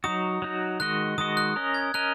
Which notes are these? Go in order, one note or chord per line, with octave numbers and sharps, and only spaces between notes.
F#3 D#4 F#4 D#6
F#3 D#4 F#4
D#3 G#3 F#4 D#5 F#6
D#3 G#3 F#4 D#5 D#6
F#6
C#4 A#4 D#5
G#6
C#4 A#4 D#5 F#6